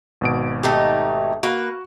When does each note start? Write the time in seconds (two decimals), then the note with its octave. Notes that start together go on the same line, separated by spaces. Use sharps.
0.21 G#1 B2 D7
0.63 A3 D#4 G4
1.43 A#3 F#4 B4